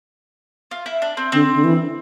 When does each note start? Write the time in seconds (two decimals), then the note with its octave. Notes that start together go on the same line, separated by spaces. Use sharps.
0.71 F4
0.86 E4
1.02 D4
1.17 C4
1.32 D3 C4
1.54 D3
1.64 E3